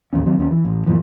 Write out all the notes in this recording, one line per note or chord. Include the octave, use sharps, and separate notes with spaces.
A1 D#2 C#3 C#4
D#3 F#3 C4
D#2 C#4
E3
A1
F#2 A#2 E3 F3